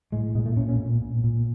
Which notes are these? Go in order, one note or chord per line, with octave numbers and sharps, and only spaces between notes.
A2 G#3
A#2 G#3
A3
A#2 C#4
C#4
A#2
A#2
A#2